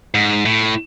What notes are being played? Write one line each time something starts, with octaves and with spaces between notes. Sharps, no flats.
G#2
A2